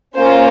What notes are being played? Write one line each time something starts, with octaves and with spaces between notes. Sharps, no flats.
A#3 C#4 F4 C5